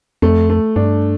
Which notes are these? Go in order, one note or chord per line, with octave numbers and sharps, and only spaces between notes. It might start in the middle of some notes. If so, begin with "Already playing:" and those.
F2 A3
A3
G2 D4